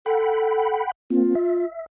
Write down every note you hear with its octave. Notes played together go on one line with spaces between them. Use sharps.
A4 F#5 G5 B5
A#3 C4 F4
E5